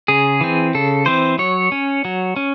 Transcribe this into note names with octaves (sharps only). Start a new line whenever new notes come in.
C#3 G#4
E3 C4
C#3 A4
E3 C4 C5
F#3 C#5
C#4
F#3
C#4